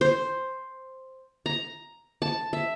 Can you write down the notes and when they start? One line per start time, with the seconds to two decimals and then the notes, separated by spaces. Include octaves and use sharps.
0.01 C5
1.46 A#5
2.22 A5
2.53 E5